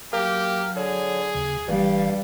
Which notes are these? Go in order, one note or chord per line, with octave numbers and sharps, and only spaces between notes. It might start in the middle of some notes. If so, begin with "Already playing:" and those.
F#3 A#3 G4 F6
D3 G#4 C#5
D#2 C#3
G1 G2 E3 G3 F5